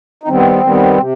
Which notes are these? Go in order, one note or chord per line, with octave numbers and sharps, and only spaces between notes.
D#4
D#3 G3 B3 C4
D#3 G3 B3
C3